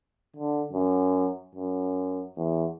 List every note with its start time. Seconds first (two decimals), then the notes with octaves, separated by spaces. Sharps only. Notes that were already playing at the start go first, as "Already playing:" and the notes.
0.36 D3
0.73 F#2
1.55 F#2
2.37 E2